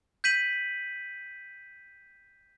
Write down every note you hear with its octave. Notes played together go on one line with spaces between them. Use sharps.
G6 B6 D#7 F#7